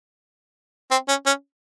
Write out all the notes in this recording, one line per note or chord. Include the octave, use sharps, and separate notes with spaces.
C4
C#4
C#4